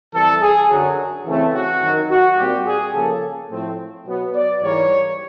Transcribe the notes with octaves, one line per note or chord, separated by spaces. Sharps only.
C3 E3 G3 A4
G#4
F#2 D3 F#3
C#3 E3 A3 C4
F#4
F#2 D#3 F#3
F#4
A#2 G3 C4 G4
G#4
C#3 F3 A#3 A4
A2 F3 A3 C4
B2 F#3 B3
D5
G#2 E3 G3 A#3 C#5